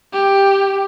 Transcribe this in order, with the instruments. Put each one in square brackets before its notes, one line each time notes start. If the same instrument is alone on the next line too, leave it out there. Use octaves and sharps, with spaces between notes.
[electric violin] G4